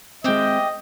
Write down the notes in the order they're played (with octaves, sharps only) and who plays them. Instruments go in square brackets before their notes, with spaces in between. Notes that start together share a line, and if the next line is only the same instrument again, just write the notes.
[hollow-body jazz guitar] G#3 C4 [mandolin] E4 G4 G5 [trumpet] D#5